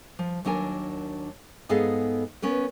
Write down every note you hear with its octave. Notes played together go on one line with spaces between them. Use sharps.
F3
D#2 F#3 D4 A#4 G#5
G#2 B3 G#4 A4 D#5 F5
B3 C#4 A#4 B4